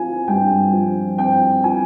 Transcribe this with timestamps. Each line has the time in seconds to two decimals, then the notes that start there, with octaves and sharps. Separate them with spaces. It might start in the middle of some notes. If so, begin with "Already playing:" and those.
Already playing: C4 F4 G#5
0.28 G2 G5
0.73 F3
1.18 C4 G5
1.64 F4 G#5